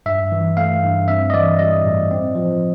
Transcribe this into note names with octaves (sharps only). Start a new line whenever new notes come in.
G2 E5
E3
A3 F5
G2
C4 E5
D#5
E3 D5
G3 D#5
A2
C4
F3